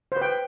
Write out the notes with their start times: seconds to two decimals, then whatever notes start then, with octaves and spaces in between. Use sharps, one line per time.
0.12 C5
0.17 B4
0.21 G5